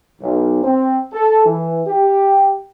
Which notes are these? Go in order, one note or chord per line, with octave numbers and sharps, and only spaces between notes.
B1
C4
A4
E3
G4